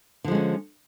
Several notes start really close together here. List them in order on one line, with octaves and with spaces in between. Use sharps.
D3 F3 G#3 C#4